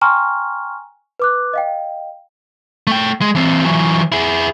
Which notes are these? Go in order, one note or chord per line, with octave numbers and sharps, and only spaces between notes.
G5 G#5 A#5 C6 C#6 F6
B4 D6 F#6
D#5 F5 G5
A3 G5
G#3
E3 C4
E3 F#3
E4 G#4